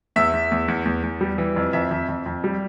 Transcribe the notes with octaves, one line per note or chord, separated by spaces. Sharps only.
E2 E5
E2
E2
E2
E2
E2
G3
E3
F2
F2 E5
F2
F2
F2
G3